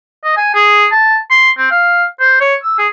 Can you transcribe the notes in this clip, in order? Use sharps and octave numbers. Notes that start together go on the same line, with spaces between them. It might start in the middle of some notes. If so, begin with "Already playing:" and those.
D#5
G#5
G#4
A5
C6
C4
F5
C5
C#5
E6
G#4